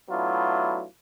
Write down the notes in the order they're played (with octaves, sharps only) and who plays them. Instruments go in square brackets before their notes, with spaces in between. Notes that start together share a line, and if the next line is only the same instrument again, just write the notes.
[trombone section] F#3 A3 B3 D4 E4 F4